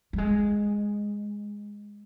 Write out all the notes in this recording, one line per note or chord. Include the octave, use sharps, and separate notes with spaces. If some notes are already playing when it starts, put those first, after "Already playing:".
G3
G#3